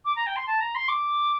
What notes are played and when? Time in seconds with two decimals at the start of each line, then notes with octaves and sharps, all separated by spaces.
0.05 D6
0.16 A#5
0.26 G5
0.36 C6
0.47 A5
0.61 A#5
0.75 C6
0.88 D6